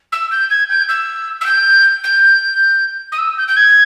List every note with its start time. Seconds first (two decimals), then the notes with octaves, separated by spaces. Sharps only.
0.12 E6
0.31 G6
0.50 G#6
0.69 G6
0.89 E6
1.41 E6
1.45 G6
2.03 G6
3.12 D#6
3.18 E6
3.37 G6
3.48 G6
3.56 G#6